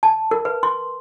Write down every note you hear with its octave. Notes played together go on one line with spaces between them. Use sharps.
A5
A#4
B4
C6